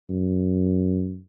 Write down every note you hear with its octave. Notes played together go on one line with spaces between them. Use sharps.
F#2